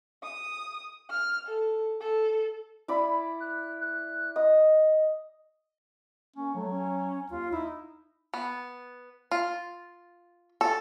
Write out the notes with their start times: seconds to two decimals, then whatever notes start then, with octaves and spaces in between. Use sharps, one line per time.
0.23 D#6
1.10 F6
1.47 A4
2.00 A4
2.88 E4 D5 B5
3.40 F#6
3.81 F#6
4.36 D#5 D#6
6.36 A#3 C#4
6.55 F#3 A3
6.70 C#4
7.30 D#2 F4
7.53 D#4 E4
8.34 B3
9.31 F4
10.61 A4